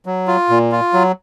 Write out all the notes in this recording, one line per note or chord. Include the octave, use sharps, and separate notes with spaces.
F#3
F4
A#2
F4
F#3